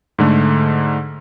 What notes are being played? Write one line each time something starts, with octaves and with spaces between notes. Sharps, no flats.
G#2 D3 A3